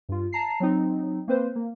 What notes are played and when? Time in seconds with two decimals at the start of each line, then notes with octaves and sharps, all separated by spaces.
0.09 G2 F4
0.33 A5 A#5 C7
0.60 F#3 C4 D#4
1.28 A#3 C4 B4 C5
1.56 A#3